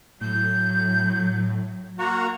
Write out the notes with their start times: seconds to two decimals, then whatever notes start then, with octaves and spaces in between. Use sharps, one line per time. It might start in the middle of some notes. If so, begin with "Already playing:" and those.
0.21 A2 F#3 G6
1.99 A#3 F#4 A#5